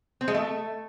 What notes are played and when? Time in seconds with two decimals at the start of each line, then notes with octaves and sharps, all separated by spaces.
0.21 C4
0.28 G#3
0.34 A3